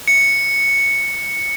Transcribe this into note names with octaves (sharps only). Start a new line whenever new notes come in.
C#7